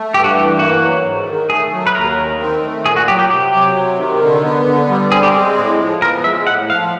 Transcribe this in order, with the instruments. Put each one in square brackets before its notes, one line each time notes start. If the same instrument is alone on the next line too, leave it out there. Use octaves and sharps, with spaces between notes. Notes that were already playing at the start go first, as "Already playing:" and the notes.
Already playing: [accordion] A3
[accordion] G2 [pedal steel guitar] G4
[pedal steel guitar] F#4
[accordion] E3 [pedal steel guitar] G4
[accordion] A#3 [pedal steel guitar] F#4
[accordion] F#3
G#2
D#3
[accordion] A3 [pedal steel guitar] G#4
[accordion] F#3
[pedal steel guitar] B4
[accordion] D#2 [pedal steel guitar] A#4
[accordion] D#3
C4
A3
[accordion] A#2 [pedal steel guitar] G#4
[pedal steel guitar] F#4
[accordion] F#3 [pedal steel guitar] G4
[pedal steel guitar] G4
[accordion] C3 [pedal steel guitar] G4
[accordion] F#3
C3
D#3
D3
B3
D3
G3
[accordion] C4 [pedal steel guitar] G#4
[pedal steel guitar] G4
[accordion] G#3 [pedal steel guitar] G#4
[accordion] A2
F3
[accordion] B3 [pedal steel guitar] A#4
[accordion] G#3 [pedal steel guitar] E5
[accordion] A2 [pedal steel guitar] F#5
[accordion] F3 [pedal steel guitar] F5